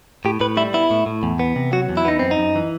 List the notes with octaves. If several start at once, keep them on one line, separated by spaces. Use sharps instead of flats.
A2 G4
A2 B4
G3 E4
B3 E4
A2
A2
E2
B3
C3
F#3 F#4
E2
E4
B3 D#4
F#2 C4
D#4
F#2
E3